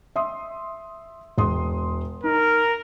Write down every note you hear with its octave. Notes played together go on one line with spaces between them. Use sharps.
E5 C6 D#6
E1 C6 D#6
D#4 A#4